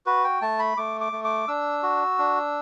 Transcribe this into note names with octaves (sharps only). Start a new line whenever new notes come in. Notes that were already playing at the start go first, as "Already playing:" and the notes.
F#4 B4
G5
A3 A5
B5
A3 D6
D6
A3
D6
D4 E6
F#4
D4